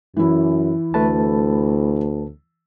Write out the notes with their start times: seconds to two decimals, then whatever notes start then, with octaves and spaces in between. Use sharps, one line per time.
0.17 F#2 E3 E4
0.94 D2 A3 B4 A5